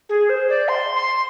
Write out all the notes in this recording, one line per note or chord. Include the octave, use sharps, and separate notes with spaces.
G#4
C5
D5
C6
C6